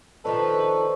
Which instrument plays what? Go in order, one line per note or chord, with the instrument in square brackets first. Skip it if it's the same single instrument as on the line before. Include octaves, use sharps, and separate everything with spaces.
[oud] D#3 F3 D4 [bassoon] A4 [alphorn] B4 [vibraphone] D5 D#5 C#6